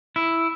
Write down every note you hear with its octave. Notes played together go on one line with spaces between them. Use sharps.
E4